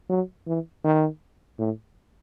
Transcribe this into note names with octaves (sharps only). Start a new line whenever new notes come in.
F#3
E3
D#3
A2